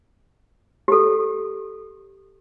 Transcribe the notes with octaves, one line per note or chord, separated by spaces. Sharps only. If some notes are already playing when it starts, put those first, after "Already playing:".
G4 A4